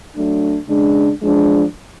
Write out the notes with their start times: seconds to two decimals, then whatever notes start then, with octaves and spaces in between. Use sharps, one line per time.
0.15 F#3 A3 D4
0.68 C#3 G#3 D4
1.22 F3 G#3 D4